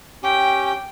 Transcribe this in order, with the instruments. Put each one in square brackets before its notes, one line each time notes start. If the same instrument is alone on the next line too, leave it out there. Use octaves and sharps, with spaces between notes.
[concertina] C#4 G4 [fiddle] G5